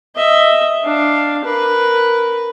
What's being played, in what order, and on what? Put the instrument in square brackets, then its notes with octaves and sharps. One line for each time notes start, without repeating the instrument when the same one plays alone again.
[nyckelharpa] D#5 E5
D4 F5
A#4 B4